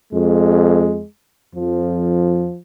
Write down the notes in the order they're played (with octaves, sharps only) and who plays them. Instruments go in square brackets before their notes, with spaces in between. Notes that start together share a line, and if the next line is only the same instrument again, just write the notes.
[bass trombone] F2 [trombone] G#3
[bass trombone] F2 [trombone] F3